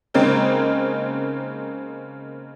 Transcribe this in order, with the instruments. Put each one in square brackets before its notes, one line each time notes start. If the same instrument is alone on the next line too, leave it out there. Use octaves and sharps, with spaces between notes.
[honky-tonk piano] C#3 G#3 A#3 C4 D#4